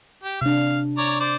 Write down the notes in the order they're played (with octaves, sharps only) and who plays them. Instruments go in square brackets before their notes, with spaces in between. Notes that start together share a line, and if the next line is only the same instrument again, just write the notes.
[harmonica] G4
[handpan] C3 D4 [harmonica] F5
[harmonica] C#5 D5 A#5
C5 D5